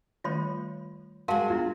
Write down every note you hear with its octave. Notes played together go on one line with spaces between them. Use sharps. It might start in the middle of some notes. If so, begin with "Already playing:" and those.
D#3 G3 A3 F4 C#5 B5
G#3 F#4 A#4 F5 A5
B3 D4 F4 A#5